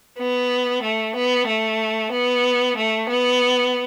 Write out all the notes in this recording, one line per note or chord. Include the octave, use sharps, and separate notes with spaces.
B3
A3
B3
A3
B3
A3
B3